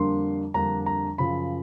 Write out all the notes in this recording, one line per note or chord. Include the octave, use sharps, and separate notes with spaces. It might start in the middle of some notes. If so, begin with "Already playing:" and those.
Already playing: F2 D3 G3 A#3 D4 C6
F2 D3 G3 A#3 D4 A#5
A#5
F#2 C#3 F3 B5